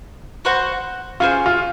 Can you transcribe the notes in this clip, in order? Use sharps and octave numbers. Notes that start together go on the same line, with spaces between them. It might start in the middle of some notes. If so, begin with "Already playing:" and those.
F#4 C5 F#5
C#4 F4 G#4 C5
F4